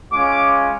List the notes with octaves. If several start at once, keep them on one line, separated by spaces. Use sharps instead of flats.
G#3 C#4 F4 D6